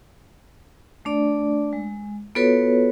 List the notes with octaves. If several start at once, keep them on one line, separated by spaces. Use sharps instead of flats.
A3 D4 D5
G#3
B3 F4 F#4 A4 B4 C#5